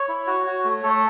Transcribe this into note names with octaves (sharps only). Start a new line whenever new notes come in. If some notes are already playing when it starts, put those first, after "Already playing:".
Already playing: C#5
E4
F#4
F#4
A3
A3 A4